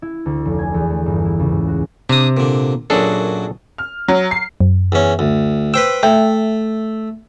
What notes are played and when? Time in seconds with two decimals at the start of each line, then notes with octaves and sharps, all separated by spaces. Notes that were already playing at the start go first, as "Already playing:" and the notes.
0.02 E4
0.26 D2
0.45 F1
0.59 G#5
0.74 E2
0.90 A3
1.06 G1
1.25 E4
1.39 C#2
1.51 G#2
1.67 F#4
2.09 C3 D4 D#6
2.37 A#2 D3
2.90 F#2 A#2 F#3 D4 G#4 A4
3.78 F6
4.08 F#3
4.31 C7
4.61 F#2
4.92 E2 C#4
5.19 D2
5.74 B4 C5 G5 E6
6.03 A3 E5 G5